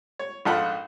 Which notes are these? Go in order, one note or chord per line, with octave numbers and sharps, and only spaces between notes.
C#5
A#1 G#2 F4 A4 F#5 B5